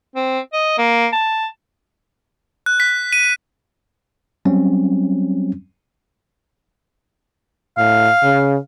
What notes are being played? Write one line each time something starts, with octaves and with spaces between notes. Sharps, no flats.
C4
D#5
A#3
A5
F#6
B6
D#7
F#3 G3 C4 C#4
A2 F5
C#3